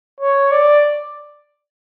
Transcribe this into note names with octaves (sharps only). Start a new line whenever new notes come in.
C#5
D5